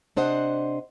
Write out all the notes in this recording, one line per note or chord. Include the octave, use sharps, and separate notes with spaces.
C3 D4 C5 D#5 F#5